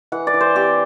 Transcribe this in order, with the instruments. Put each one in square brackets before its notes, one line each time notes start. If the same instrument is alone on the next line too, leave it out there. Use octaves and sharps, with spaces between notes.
[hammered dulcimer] E3 F#5
D5
E3
C5
C4 G4